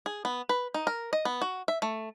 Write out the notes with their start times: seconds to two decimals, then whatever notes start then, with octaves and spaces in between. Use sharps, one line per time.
0.06 G#4
0.25 B3
0.49 B4
0.74 D#4
0.87 A#4
1.13 D#5
1.25 B3
1.42 F#4
1.68 E5
1.82 A3